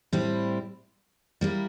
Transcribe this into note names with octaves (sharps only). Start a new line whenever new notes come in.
A2 G3 C4 E4
G3 A#3 E4